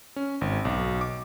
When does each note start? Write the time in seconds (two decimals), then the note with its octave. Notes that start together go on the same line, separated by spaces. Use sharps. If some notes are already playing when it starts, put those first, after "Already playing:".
0.16 C#4
0.41 G#1
0.65 B1
1.01 D6